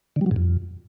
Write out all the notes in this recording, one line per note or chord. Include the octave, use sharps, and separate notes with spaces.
D3
G3
F#3
G#2
F2